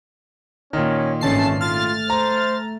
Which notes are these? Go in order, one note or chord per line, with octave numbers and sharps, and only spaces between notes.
A#2 D#3 C#4
G#1 D3 E3 A3 C#4 A5 C7
A3 F4 F6 A6
C5 A#5